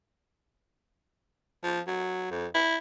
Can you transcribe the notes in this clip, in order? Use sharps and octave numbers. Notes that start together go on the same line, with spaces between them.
F3
F#3
F2
E4